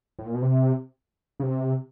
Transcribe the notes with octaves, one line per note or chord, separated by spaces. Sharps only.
A2
A#2
B2
C3
C#3
C3